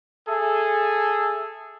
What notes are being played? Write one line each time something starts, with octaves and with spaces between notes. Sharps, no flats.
G#4 A4 E5